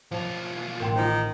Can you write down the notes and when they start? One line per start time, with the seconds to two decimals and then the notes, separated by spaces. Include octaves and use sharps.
0.11 B1 F3 F4
0.80 A1 A#4 G5 C6
0.95 D#3 F4 C5